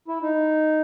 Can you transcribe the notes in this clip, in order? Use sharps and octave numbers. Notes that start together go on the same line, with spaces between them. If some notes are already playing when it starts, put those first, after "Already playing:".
E4
D#4